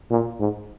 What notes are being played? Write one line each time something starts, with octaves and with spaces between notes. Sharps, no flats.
A#2
G#2